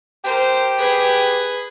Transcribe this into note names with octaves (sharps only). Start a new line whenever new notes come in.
G4 A#4 C5
G#4 B4